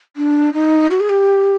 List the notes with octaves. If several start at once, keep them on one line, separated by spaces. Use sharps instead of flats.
D4
D#4
F#4
G#4
G4